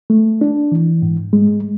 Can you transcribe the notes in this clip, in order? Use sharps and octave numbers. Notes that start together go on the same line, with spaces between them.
A3
D4
E3
G#2
G#3